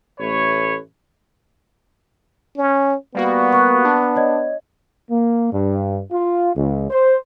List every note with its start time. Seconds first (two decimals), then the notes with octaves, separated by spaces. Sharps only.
0.20 A1 A3 B4 C#5
2.56 C#4
3.15 G3 A#3 B3 F#4
3.53 C#6 F#6
3.85 D4
4.16 C#5 D#5 G#6
5.11 A#3
5.52 G2
6.12 F4
6.55 C#2
6.90 C5